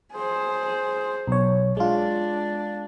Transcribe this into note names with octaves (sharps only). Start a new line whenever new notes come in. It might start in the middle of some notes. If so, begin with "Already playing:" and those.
G#4 C5
B1 C#5
G#3 D4 F4